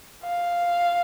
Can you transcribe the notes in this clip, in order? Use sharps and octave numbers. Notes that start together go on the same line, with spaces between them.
F5